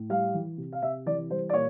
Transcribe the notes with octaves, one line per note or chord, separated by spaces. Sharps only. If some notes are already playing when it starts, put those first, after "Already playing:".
Already playing: A2
G3 F5
E3
C3
F5
C3 E5
E3 D5
G3 C5
D5
A#2 C#5